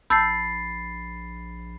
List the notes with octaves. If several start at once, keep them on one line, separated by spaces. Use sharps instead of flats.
A#1 A5 B5 E6 G6 A6 C7